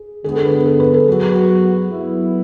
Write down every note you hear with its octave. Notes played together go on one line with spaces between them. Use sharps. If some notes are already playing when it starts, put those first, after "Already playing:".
Already playing: G#4
D3 G#3 B3 G#4
A4
B4
A4
B4
A4
F#3 B3 F#4 G#4
B4
F#3 B3 E4